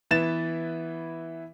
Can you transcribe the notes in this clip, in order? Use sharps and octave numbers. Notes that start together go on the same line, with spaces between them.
E3 B3 E4 A6 E7